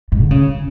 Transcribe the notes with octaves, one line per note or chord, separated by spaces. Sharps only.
G#2
D3
C#3